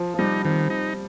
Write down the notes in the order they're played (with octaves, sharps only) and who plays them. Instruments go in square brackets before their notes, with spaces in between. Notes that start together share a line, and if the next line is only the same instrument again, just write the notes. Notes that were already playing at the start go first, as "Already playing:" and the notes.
Already playing: [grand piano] F3
F3
[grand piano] G3 [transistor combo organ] D#4
[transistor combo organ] D#3 [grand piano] C4
[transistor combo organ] D#4